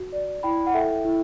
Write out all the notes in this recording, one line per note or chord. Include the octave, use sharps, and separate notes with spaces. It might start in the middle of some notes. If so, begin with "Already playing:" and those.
Already playing: F#4
D5
E4 G5 B5
F#5
A4 E5 G5
E4